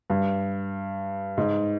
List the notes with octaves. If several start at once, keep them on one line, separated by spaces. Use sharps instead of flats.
G2
G#2